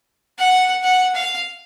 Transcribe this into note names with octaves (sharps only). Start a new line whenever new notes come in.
F#5
F#5
F5